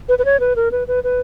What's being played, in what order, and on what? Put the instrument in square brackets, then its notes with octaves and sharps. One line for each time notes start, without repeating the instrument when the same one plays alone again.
[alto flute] B4
B4
C#5
B4
A#4
B4
B4
B4